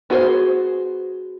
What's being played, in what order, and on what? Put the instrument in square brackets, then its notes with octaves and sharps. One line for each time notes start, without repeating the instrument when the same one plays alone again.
[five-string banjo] B3 F#4 G#4 B4 C5